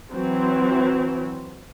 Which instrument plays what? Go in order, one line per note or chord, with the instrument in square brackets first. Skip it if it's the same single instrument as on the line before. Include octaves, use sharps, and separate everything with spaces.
[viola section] E3 F#3 C4